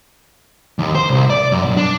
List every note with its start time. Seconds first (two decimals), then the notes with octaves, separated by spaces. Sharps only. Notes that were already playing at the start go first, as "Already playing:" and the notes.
0.79 D#2
0.95 C5
1.10 C2
1.30 D5
1.52 F#2
1.65 B1
1.77 D4